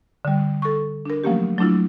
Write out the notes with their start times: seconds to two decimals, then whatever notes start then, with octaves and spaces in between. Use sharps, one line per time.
0.25 D3 G3
0.62 A4 C#6
1.06 D4 A#4
1.24 F3 F#3 A3 A#3 C#4 G4
1.58 F#3 A3 D4 E4 F4